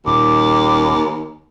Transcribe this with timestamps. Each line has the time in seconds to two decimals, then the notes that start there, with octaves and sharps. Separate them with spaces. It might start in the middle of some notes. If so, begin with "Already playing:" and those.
0.06 D#1 D#2 D6